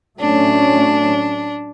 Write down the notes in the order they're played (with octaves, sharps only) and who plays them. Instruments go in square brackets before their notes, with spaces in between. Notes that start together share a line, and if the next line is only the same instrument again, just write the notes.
[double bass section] A2 F#3 A3 C#4 [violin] D4